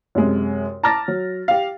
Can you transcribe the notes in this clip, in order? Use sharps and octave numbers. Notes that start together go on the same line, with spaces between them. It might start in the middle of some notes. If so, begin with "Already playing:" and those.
F#2 C3 G#3
A5 A#5 D6 F6 A6 A#6
F#3
G4 F5